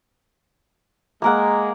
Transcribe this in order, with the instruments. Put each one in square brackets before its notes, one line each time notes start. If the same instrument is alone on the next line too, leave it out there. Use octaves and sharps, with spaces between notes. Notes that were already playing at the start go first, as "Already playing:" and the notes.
[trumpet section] G#3 [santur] A#3 A#4 F#5